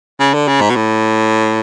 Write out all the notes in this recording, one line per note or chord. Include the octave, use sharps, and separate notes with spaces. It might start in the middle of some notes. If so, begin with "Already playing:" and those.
C#3
D3
C#3
G#2
B2
A2